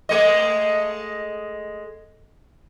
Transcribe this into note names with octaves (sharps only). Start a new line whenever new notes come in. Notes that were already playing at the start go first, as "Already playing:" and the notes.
G#3 A3 D#5